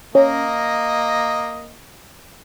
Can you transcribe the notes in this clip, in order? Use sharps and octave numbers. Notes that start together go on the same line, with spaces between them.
A#3 C#4 D#5